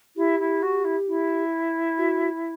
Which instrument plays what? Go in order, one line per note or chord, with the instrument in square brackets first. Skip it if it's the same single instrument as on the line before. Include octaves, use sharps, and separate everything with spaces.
[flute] E4 [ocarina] G4
[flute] E4
F#4
E4
E4
[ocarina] F#4